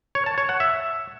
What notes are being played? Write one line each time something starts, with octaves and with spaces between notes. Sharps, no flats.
C#5
A5
C#5
F#5
E5